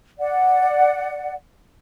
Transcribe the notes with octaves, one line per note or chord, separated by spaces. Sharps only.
D5 F#5